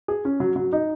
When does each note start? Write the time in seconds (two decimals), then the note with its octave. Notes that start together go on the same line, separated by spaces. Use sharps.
0.08 G#4
0.25 C#4
0.40 F#3
0.56 F#3
0.73 D#4